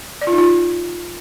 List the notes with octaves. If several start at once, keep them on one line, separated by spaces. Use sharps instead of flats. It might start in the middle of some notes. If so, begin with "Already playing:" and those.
D5
F4
D#4
F4